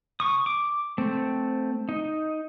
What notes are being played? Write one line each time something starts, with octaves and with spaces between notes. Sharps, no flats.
C#6 D#6
D6
A3 C4
D#4